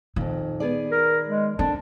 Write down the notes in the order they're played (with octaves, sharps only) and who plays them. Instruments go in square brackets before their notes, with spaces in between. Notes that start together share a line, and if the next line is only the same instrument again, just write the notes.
[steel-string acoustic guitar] F2 A#2 [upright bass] D#3
[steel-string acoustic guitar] B3 G#4 D5
[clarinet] A#4
G#3
[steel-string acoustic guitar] D3 D4 [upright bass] C4 [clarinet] A5